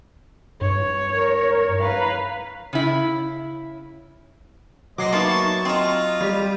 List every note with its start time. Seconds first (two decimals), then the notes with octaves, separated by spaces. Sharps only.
0.61 G2 C#5
1.13 A#4
1.79 B4 F5 A#5
2.73 C#3 E4
4.98 F#3 G#3 C5 D#5 D6 C7
5.13 A#3 B3 D#4 E5 A5 C#6
5.65 C4 F4 D#5 A#5
6.21 G3 G4